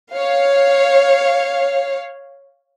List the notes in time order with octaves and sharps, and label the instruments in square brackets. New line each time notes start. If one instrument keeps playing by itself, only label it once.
[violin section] C#5 F5